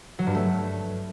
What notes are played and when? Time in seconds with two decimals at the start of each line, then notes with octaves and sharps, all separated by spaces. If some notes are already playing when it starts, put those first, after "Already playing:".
0.19 F#3
0.27 G2
0.34 A3